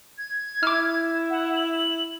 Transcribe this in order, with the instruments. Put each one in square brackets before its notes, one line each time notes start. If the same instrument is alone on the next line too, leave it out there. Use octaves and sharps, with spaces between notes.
[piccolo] G#6
[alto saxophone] E4 [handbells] D6 F6
[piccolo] F#5
F#7